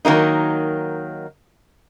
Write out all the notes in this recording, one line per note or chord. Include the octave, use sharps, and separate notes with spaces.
D#3 F#3 A#3 D#4